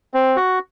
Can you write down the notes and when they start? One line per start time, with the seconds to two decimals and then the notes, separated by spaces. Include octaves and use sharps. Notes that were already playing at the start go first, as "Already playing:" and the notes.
0.14 C4
0.36 F#4